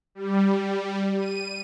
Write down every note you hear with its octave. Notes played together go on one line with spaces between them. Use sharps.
G3
D#7